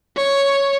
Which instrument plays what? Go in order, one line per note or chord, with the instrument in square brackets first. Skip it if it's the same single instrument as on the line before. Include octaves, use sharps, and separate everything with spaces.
[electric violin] C#5